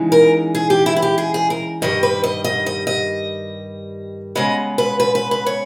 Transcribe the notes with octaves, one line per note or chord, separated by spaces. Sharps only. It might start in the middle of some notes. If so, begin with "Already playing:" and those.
Already playing: C#3 E3 G#3 D#4
A#4
G#4
G4
E4
E4
G4
G#4
G#4
A#4
G2 D#3 G3 D#5
B4
D#5
D#5
D#5
D#5
C#3 G#3 B3 D#5
B4
B4
B4
B4
C#5